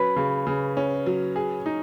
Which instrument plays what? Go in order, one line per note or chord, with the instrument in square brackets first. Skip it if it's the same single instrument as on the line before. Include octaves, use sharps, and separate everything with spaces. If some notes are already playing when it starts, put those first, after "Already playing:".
Already playing: [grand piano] F#3 C#4 [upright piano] B4 B5
[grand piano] C#3
C#3
C#4
F#3
G#4
D#4